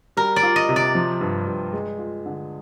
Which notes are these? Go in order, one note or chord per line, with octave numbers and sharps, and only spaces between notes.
G3 A#4
D5
F4
D#5
C3
D5
F3
G2
G2
G#3
F4
D3